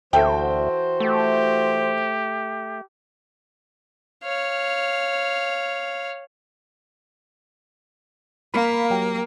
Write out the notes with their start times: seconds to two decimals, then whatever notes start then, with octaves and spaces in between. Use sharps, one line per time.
0.13 D2 E3 F#4 A4 C5 E5 G5
1.00 A3 G4
4.24 C#5 F5
8.54 A#3 F5 B5
8.90 F#3 G4